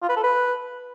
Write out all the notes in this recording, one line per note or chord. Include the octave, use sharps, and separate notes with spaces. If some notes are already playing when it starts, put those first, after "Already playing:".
F4
B4
A4
B4